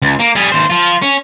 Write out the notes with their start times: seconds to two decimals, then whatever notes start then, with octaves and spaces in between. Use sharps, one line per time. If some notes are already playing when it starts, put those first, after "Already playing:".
0.02 C#2
0.20 A#3
0.35 G3 G#4
0.52 D#2 C5
0.70 F3 F4
1.02 C#4